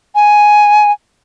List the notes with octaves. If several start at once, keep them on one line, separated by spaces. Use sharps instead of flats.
G#5